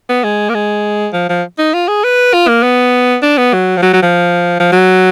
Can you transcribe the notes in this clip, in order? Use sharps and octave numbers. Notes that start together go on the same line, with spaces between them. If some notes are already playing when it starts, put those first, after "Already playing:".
B3
G#3
A#3
G#3
F3
F3
D#4
F4
G#4
B4
F4
A#3
B3
D4
B3
F#3
F3
F#3
F#3
F3
F3
F#3